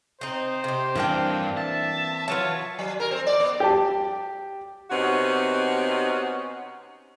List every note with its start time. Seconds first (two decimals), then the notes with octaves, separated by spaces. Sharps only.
0.21 C4 D#4 C5
0.64 C3 G4
0.96 G2 E3 A#3 C4 D4 G5
1.57 E5 A5
2.28 F#3 F4 B4 C#5
2.79 F#3
3.00 A#4
3.11 C4
3.27 D5
3.40 B3
3.60 G4 A5
4.90 C3 B3 C#4 D#4 F#4